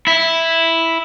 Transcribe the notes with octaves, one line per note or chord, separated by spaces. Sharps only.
E4 E5